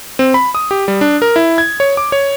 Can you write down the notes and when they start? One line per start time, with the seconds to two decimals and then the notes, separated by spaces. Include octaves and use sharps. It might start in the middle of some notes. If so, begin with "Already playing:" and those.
0.19 C4
0.34 B5
0.55 D#6
0.71 G4
0.88 G3
1.01 D4
1.22 A#4
1.36 E4
1.58 G#6
1.80 C#5
1.97 D6
2.12 C#5